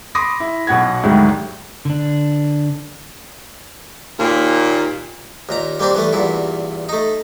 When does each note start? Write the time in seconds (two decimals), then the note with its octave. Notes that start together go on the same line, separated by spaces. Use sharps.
0.15 B5 C6 D6 D#6 A#6
0.40 E4
0.67 B1 B2 F#5 G#6
1.04 D2 G#2 D#3 F#3 G3
1.85 D3 D4
4.19 D#2 A#2
5.49 D#2 A#2 A#5
5.79 G3 A#3 C4 D4 G4
5.95 E3 G3 A3
6.13 E2 G2 A#2 E4
6.89 A3 D#4